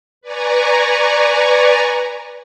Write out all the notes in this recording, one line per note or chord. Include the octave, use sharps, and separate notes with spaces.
B4 D5 G#5 A#5 C#6